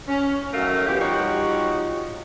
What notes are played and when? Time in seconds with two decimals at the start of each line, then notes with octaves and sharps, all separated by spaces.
0.08 C#4
0.53 F#2 D#3 F#3 A3 A#4 F5
0.86 B2 E3 C#4 E4 G4
1.00 F3 G3 D#4 F#4 G4 C#5